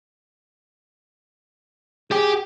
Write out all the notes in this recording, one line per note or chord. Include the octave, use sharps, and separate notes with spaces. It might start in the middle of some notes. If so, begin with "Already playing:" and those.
G4 G#4 G5